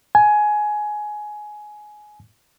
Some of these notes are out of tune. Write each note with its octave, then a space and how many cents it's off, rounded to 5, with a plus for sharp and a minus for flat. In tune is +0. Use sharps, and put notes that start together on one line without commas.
G#5 +15